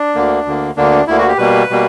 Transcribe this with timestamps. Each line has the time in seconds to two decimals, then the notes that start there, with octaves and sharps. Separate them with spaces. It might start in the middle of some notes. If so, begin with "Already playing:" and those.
Already playing: D4
0.15 D2 D3 A#3
0.46 D2 D3 A#3
0.77 D2 D3 A#3 D4
1.07 D2 D3 A#3 E4
1.18 F#4
1.28 G4
1.38 B2 G3 A#3 B4
1.70 B2 G3 A#3